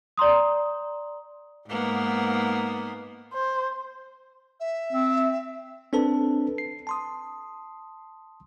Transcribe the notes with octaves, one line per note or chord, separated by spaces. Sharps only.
D5 A#5 C6 D#6
G#2 A#3 B3
C5
E5
C4
C4 D4 A4 B4 A5
C7
A5 C6 D#6